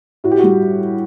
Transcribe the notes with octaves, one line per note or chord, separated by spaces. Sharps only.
A2 F#4
G4
F#4
G3